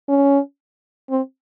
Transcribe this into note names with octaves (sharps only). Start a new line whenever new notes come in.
C#4
C4